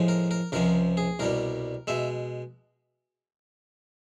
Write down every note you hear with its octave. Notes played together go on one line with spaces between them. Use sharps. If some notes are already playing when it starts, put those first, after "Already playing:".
Already playing: A2 F3 G#3
A#4
A#4
C#2 C3 F3 G#3 A#4
G#4
C2 B2 G3 A#4
B2 G#3 E5